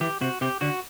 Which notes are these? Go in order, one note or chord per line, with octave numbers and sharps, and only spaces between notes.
E3 G4
C3 F#4
C3 G4
D3 F#4